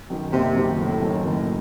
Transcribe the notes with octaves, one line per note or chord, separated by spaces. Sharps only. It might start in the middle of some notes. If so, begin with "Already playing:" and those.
F#2 D#3
F#1 C3
F#2 D#3
F#1 A2
F#2 D#3
F#1 A2